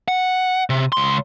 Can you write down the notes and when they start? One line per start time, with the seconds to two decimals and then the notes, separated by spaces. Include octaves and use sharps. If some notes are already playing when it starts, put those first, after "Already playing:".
0.08 F#5
0.70 C3
0.92 C#2 C6